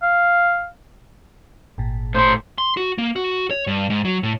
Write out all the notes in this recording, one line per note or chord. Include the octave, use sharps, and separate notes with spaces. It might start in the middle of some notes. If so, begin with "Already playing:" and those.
F5
G#1 A#2
A2 C5 C6
C6
F#4
A#3
F#4
C#5
G2
G#2
F#3
A2